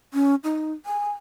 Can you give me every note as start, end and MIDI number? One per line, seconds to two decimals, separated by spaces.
0.14 0.35 61
0.44 0.72 63
0.86 1.11 80